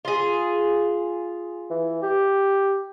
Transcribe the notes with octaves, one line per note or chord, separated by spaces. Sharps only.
F4 G#4
E3
G4